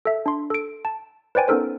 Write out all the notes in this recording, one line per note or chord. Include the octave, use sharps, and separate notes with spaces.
A4 E5
D4 C6
A4 D7
A5
B4 C5 D5 G5 G#5
B3 C#4 D#4 A4 A#4 C5